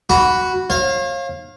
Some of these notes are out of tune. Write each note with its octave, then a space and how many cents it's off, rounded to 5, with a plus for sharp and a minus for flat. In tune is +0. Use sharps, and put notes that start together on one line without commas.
F#4 +0 B5 +0 D6 -45
C#5 -40 F5 +0